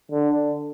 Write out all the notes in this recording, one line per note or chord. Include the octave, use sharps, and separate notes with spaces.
D3